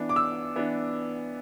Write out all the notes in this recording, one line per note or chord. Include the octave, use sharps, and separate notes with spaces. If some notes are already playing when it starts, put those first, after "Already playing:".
Already playing: E3 B3 D4
D6
E6
E3 B3 D4